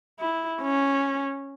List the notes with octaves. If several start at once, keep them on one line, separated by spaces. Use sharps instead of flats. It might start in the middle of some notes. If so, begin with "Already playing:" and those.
E4
C#4